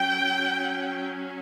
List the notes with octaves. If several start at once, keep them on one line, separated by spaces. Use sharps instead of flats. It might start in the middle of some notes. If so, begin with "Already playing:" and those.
Already playing: F#3 C#4 G5